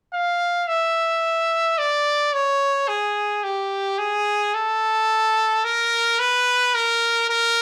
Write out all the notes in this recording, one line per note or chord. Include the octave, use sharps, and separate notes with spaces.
F5
E5
D5
C#5
G#4
G4
G#4
A4
A#4
B4
A#4
A#4